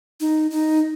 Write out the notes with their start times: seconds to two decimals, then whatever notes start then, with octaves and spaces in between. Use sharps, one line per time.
0.20 D#4
0.51 D#4